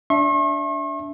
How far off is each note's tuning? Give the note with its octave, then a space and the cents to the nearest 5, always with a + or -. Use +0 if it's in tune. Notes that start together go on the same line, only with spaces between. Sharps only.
D4 -15 E5 +0 C#6 -45